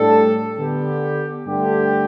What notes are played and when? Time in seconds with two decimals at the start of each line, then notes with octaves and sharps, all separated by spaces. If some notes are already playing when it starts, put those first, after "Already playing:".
Already playing: A2 G3 D4 A4
0.57 D3 B3 G4
1.47 G2 D3 A3 G4